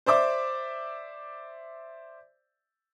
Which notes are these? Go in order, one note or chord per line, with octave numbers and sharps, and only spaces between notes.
C5 D5 E5 D6